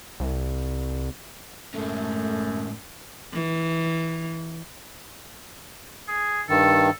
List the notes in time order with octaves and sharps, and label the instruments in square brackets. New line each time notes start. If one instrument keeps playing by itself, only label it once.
[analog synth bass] C2
[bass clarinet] F#2 [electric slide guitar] A2 G#3 C#4 [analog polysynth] A3
[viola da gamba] E3
[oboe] G#4
[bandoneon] G2 D#3 [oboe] A4